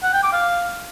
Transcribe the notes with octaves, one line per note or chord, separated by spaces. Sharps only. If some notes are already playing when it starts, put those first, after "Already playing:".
F#5
G5
D6
F5